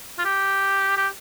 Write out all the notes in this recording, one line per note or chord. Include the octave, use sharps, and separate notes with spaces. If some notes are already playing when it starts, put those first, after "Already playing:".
F4
G4
G4